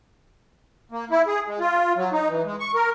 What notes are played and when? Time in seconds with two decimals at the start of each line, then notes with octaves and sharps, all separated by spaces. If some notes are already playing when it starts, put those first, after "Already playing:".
0.92 A#3
1.11 E4
1.27 G#4
1.48 G#3
1.60 F4
1.96 F#3
2.12 D#4
2.28 E3
2.45 G#3
2.60 C#6
2.75 A#4